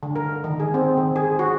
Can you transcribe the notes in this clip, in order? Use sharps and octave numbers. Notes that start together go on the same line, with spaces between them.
D3
A#4
D#3
G#4
C4
D#3
G#4
F#4